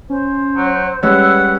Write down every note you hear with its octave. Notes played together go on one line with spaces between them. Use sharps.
C#4 C5
F#3
G3 G#3 C#4 B4 F#5 E6